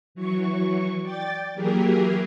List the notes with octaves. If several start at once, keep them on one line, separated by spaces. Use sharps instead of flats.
E3 F#3 C#6
D5 G5 A6
E3 F#3 A#3 G4 G#4 A#4